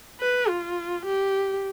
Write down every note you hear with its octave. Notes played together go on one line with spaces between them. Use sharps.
B4
F4
G4